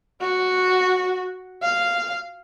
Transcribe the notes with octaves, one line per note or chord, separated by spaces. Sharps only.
F#4
F5